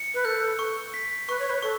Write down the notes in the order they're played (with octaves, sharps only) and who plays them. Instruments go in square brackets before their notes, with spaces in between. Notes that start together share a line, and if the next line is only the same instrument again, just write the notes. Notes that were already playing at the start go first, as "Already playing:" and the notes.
Already playing: [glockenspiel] C#7
[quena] B4
[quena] A4 [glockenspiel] G6
[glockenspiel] C#6
B6
[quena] B4 [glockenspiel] C#6
[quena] C#5
B4
[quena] A4 [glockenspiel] C#6